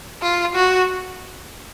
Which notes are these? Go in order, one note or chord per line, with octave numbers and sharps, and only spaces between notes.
F4
F#4